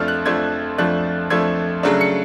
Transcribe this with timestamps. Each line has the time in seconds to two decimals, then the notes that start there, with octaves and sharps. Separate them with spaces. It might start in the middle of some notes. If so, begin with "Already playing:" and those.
Already playing: F2 F3 A3 D4 F6
0.08 F#6
0.26 F2 F3 A3 D4 G#6
0.78 F2 F3 A3 D4 F#6
1.30 F2 F3 A3 D4 G#6
1.83 C#3 F#3 A3 D4
2.01 C#7